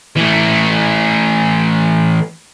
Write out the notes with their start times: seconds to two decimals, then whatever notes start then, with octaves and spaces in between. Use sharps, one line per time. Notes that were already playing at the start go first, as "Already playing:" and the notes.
0.16 E3 A3